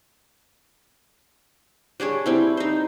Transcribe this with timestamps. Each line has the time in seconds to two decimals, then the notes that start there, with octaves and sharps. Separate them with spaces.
2.00 G3 D4 G#4 C#5
2.26 G3 C4 E4
2.57 D#4 C5